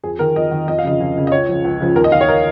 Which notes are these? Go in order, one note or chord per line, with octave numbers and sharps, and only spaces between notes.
F2 G#4
D#3 A#4
F2 D#5
D#3
F2 D#5
F5
C#3 F3 D#5
F2
C#3 F3
D#5
C#2 C#5
C#3 F3
C#2
C#3 F3
D#2 A#4
D#5
D#3 F5
C#5
A#4